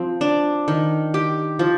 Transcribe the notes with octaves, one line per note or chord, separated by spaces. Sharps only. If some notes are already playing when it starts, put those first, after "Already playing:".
Already playing: F3 C4
D4
D#3
G4
F3